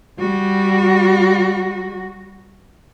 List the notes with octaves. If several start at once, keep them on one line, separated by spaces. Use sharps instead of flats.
G3 F#4